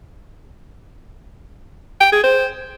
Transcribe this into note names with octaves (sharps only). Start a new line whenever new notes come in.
G5
G#4
C5